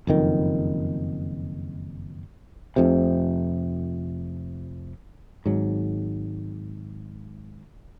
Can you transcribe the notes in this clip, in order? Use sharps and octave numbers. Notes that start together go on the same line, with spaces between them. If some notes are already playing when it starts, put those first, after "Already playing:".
F#1 F2 D#3
F1 F2 C3
G#1 G#2 F#3